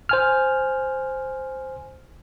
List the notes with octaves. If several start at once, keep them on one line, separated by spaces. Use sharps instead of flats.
C5 G#5 F6